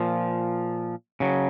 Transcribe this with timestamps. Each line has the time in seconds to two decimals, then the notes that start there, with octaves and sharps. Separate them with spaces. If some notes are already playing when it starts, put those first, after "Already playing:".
Already playing: A#2 F3
1.20 C#3 F#3